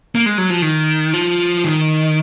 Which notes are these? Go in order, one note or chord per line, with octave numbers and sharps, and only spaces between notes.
A#3
G#3
F#3
F3
D#3
F3
D#3